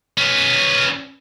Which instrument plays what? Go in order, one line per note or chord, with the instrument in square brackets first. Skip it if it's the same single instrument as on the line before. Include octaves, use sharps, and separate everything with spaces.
[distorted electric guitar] C#4 B4